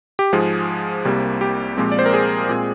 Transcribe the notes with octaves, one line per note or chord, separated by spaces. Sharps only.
G4
G#2 F3 G#3 G#4
C2 C3 G3 A#3
G4
A#2 F3 G#3 C4
D5
C5
A#4
G#4
A#2 G#3 C4